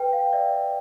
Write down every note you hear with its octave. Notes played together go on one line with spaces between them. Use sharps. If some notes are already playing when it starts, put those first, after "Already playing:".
Already playing: B4 G5
F5
D5 E5